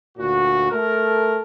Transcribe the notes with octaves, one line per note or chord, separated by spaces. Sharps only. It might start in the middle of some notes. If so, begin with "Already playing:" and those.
D2 A#2 F#4
A3 A4 A#4